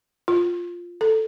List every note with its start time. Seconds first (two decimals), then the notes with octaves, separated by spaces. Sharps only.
0.28 F4
1.01 A4